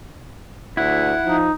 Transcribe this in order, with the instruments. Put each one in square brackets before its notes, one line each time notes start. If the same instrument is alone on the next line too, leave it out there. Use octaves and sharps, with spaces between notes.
[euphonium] D2 [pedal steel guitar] E4 [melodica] F#5
[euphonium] F3 [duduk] D#4